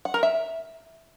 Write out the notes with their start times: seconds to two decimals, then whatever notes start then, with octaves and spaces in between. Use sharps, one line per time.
0.05 F#5
0.14 A#4
0.23 E5